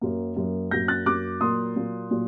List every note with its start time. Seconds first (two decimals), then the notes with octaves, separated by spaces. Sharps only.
0.01 F#2 F#3 A#3
0.36 F#2 F#3 A#3
0.71 F#2 F#3 A#3 G6 A#6
0.88 F#6 A6
1.06 F#2 F#3 A#3 D6 F#6
1.41 A#2 F#3 A#3 C6 D#6
1.76 A#2 F#3 A#3
2.11 A#2 F#3